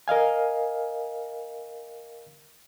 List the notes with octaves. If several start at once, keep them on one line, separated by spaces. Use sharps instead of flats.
A#4 D#5 F5 G#5